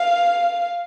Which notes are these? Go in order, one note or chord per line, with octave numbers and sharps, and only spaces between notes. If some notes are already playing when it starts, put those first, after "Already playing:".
Already playing: F5